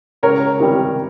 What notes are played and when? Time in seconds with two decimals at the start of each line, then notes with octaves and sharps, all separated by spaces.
0.23 C#2 A#4 C#5
0.59 C3 D#3 G3